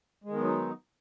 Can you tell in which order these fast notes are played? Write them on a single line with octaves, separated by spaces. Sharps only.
G#3 D#3 B3 F#3 D#4